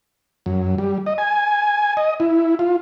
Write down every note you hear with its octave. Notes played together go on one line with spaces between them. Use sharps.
F#2
G3
D#5
G#5
D#5
E4
F4